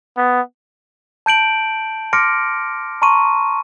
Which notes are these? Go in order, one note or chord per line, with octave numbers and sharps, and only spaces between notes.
B3
A5 G6 D7 F#7
C6 D6 F6 A#6 C#7 D7
A5 A#5 C6 C#6 D#7